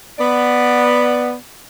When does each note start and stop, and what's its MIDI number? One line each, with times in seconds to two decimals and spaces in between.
0.19 1.34 59
0.19 1.34 74